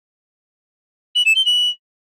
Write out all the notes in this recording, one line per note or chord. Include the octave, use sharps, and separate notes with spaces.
F#7
E7
G7
F#7